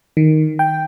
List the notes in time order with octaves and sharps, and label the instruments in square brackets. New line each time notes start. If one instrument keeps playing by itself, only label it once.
[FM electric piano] D#3
G5